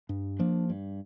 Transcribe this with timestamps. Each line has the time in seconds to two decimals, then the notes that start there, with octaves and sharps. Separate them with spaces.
0.09 G2
0.39 F3 A#3 D4
0.70 G2